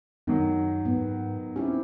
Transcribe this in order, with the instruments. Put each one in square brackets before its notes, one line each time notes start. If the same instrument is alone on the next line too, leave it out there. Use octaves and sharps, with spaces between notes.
[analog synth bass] F#2 [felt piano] D#3 F#3
[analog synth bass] G#2 [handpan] B3
[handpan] C4 E4 G4 [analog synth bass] C#4